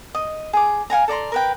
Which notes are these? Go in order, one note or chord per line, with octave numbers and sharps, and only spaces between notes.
D#5
G#4 D6
F5 F#5 G#5 A#5
A4 D5 A#5 C6
A#4 B4 G5